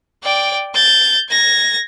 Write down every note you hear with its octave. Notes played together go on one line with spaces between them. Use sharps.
D5 G5
G6 A6
G#6 A#6